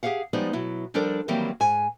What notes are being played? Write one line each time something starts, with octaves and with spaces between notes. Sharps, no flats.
G4 G#4 C#5 F5 F#5
F3 G3 G#3 B3 D#4 D5
B2 F#3 E4
F3 G3 D4 A4 A#4 D5
D#3 E3 F#3 G3 A#3 C4
G#2 G#5